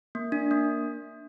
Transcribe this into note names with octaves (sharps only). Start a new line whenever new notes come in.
A#3
D4
A#3